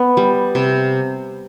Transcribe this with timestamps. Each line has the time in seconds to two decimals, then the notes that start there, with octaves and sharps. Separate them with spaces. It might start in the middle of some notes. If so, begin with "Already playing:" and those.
Already playing: B3
0.17 G3
0.55 C3